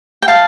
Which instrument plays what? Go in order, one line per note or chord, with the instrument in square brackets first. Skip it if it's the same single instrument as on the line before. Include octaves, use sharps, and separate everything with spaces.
[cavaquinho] G5
F5 A5